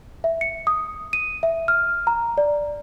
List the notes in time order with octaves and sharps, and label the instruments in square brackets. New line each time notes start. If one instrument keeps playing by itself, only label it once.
[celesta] E5
C#7
D#6
D#7
E5
F6
A#5
D5